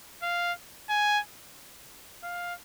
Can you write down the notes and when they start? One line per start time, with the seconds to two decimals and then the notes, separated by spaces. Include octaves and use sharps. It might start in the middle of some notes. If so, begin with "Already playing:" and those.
0.22 F5
0.90 G#5
2.24 F5